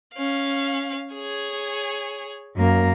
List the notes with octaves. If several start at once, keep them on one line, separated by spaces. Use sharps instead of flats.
C#4 F5
G#4 C#5
F#2 A#3